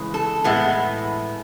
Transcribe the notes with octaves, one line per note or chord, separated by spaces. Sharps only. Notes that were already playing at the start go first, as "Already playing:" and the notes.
Already playing: C#3 E3 G#3
A4
A2 E3 G#3 B3